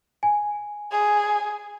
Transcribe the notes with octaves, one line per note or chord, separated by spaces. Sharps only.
G#5
G#4